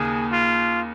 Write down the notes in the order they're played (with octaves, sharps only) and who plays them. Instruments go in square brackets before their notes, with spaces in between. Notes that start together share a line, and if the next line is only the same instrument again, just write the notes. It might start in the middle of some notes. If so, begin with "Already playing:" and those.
Already playing: [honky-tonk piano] D#2 C#3 [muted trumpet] G#4
[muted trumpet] F4